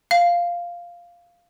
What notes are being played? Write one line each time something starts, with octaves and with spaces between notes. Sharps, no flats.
F5